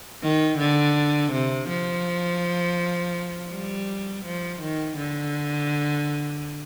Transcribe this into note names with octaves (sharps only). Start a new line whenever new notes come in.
D#3
D3
C3
F3
G3
F3
D#3
D3